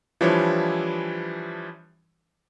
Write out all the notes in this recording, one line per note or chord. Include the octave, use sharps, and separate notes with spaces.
E3 F3 G3 D4 E4 C#5